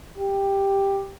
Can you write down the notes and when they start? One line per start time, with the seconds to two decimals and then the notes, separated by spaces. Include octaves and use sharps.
0.18 G4